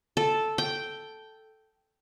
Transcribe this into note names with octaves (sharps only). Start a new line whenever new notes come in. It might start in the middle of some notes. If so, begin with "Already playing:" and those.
A4
G5